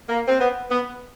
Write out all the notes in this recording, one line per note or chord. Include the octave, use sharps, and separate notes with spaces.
A#3
C4
B3
B3